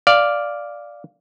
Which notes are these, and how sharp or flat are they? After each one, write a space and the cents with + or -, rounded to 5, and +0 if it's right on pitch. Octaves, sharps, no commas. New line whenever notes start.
D5 +0 F5 +0